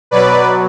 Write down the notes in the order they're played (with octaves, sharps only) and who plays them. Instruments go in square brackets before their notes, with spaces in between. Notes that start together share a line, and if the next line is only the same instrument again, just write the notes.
[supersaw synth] B2 F#3 B4 D5